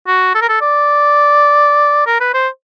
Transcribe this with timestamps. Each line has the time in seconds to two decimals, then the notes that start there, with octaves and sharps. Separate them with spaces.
0.07 F#4
0.35 A4
0.42 A#4
0.49 A4
0.61 D5
2.07 A#4
2.21 B4
2.34 C5